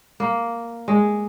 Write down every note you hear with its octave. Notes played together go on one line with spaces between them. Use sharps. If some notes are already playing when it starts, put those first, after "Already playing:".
A#3
G#3